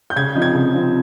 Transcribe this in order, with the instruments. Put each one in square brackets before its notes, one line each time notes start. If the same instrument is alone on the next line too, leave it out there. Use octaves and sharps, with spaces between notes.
[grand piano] G6
C#3 G#6
F3 C4 D#4
G#6
C#3
F3 C4 D#4